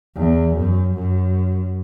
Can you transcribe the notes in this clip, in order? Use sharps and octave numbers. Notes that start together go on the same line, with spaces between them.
E2
F#2
F#2